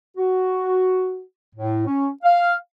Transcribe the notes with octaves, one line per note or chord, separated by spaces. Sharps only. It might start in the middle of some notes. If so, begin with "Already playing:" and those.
F#4
A2
C#4
F5